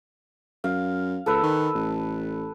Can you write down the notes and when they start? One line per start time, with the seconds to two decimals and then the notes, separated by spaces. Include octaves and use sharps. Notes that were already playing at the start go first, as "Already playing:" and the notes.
0.64 F#2 F5
1.26 C#2 A4 B4 E6
1.43 D#3
1.75 A1